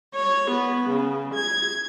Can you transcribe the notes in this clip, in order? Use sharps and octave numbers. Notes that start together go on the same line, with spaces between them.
C#5
B3
C#3
G#6